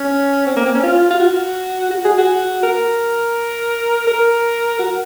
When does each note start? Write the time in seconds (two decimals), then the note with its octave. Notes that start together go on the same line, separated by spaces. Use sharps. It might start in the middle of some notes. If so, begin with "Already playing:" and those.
Already playing: C#4
0.47 C4
0.57 A#3
0.66 C4
0.75 C#4
0.83 F4
1.11 F4
1.20 F#4
1.91 F#4
2.05 G#4
2.18 F#4
2.63 A#4
4.07 A#4
4.79 F#4